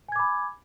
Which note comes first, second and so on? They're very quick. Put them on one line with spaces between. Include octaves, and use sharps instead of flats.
G#5 G#6 D6 B5